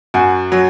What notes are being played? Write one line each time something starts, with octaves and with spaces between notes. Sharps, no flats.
F#2 F#4
F#3